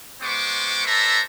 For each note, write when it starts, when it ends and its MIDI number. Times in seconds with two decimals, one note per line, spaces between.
0.22 0.82 56
0.22 0.82 59
0.22 0.82 72
0.22 0.82 85
0.22 0.82 86
0.85 1.20 69
0.85 1.20 71
0.85 1.20 72
0.85 1.20 74
0.85 1.20 76
0.85 1.20 82